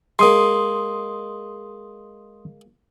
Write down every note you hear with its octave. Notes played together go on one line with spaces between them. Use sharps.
G#3 A#3 C6 D#6